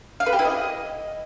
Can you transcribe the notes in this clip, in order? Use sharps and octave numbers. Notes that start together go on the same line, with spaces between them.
F5
B4
G4
E4
D#5